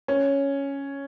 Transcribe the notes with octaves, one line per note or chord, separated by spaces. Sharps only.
C#4